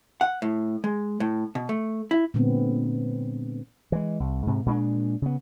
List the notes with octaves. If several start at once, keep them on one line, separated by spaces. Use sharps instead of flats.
F#5
A2
G#3
A2
B2
A3
E4
A#2 D3 G#3 B3 C4
E3 G#3
C2
G#2 C3
A#2 G#3 C#4 D4
C#3 B3